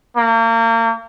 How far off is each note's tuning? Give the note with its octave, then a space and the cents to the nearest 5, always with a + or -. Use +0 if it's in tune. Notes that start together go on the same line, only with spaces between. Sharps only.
A#3 -35